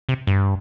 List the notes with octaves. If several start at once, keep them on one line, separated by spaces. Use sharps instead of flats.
C3
G2